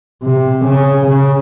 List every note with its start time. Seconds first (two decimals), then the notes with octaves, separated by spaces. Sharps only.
0.24 C3
0.66 C#3
1.07 C#3